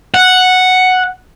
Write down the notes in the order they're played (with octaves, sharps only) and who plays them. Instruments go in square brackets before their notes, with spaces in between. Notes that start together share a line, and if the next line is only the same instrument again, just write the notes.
[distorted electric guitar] F#5